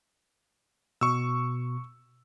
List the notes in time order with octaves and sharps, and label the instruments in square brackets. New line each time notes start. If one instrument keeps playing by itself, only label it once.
[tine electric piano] B2 [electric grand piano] C#6 E6